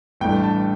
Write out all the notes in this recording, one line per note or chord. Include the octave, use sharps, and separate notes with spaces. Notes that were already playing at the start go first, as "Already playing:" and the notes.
A1 G2 E3 A3 D4 G5
A5